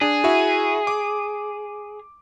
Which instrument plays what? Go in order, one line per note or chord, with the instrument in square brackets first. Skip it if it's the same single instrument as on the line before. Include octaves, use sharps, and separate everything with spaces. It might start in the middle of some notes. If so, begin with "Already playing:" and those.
[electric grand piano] D4 [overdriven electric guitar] G#4
[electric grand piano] E4 F#4 E5
D6